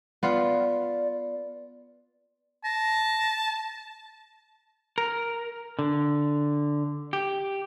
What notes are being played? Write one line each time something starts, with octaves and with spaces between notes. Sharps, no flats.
B3 F4 D5
A5 A#6
A#4
D3
G4